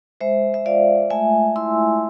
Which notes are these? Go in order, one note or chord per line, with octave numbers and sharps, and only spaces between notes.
G#3 C5 E5
E5
F4 D5 F5
A3 E5 G#5
E4 C6 E6